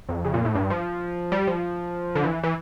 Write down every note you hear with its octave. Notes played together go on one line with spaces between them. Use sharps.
F2
C#3
A#2
A2
G2
F3
G3
F3
D3
E3
E3